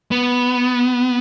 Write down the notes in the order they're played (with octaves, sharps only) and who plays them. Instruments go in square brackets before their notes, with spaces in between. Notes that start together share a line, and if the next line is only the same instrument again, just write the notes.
[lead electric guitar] B3